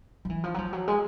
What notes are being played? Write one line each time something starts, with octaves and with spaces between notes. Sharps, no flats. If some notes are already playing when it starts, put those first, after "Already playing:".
F3
E3
F3
F#3
F3
F#3
G#3